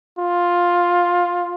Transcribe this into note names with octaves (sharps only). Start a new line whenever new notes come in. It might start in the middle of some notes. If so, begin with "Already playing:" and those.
F4